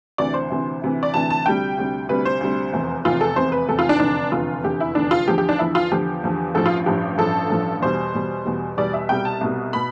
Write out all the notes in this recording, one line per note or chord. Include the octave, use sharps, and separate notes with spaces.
D2 C3 E3 D5
C5
D2 C3 E3
D2 C3 E3
D5
D2 C3 E3 A5
A5
D2 C3 G3 G5
D2 C3 G3
D2 C3 G3 B4
C5
D2 C3 G3
F1 E2 C3
F1 E2 C3 F4
A4
F1 E2 C3 C5
B4
F1 E2 C3 A4
F4
D4
F1 E2 D3 D4
F1 E2 D3 F4
F1 E2 D3 G4
E4
F1 E2 D3 D4
F4
E2 D3 F3 G4
G4
D4
E2 D3 F3 E4
F4
E2 D3 F3 G4
E2 D3 F3
A1 G2 F3 A4
F4
A1 G2 F3 G4
A1 G2 F3 A4
A1 G2 F3
E2 B2 G3 C5
E2 B2 G3
E2 B2 G3
E2 B2 G3 D5
E5
C2 B2 G3 G5
A5
C2 B2 G3
B2 B5